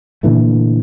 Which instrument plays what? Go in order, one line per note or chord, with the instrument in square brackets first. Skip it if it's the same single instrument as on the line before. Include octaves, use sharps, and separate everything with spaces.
[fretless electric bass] A#2 D3 E3 A3